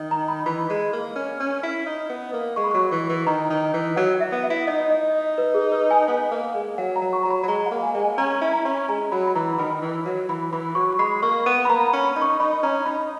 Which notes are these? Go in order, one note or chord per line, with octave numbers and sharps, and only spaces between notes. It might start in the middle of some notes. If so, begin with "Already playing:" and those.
Already playing: D#3
A#5
B5
E3 B5
G#3
A#3
C#4
C#4
E4
D#4
B3
A#3
G#3 C#6
B5
F#3 C#6
E3
E3
D#3 A#5
D#3
E3
F#3 F#5
E5
B3
E5
E4
D#4 D#5
D#5
B4
G#4
B4
G#5
B3 G#5
A#3
G#3
F#3 F#5
A#5
F#3
C#6
F#3 A#5
B5
F#3 B5
G#3 A#5
F#5
A#3
G#5
G#3
G#5
C#4 A#5
E4
A#5
C#4
G#3 A#5
F#3 B5
B5
E3 A#5
D#3 B5
E3
F#3
E3 B5
E3 B5
F#3 C#6
C#6
G#3 B5
A#3 C#6
B3
B5
A#3 A#5
A#5
B5
C#4
B5
D#4
C#6
D#4 B5
C#4 A#5
D#4 B5